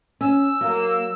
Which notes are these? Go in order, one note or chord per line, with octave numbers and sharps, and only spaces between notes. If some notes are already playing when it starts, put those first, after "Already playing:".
C#4 E6
F#3 A#3